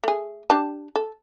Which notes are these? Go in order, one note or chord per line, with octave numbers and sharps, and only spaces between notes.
A3 G#4
D4 G4 A5
A4